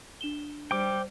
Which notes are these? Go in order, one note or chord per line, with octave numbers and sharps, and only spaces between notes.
D4 E7 G7
G3 C5 G5 D6